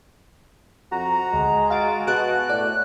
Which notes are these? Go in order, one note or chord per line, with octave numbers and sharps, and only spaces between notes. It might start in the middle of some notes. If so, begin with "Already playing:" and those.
F2 F#4 A#5
D2 G#3
F#4 F5 A6 D7
B2 G#4 A5 F#6 D7
A2 D5